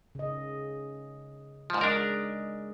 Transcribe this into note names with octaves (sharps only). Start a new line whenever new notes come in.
C#3 D#5
G#2 F3
G#3 D4 A#4 D5 D#5